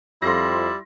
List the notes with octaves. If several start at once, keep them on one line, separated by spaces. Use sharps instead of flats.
F2 G3 E4 C6 A#6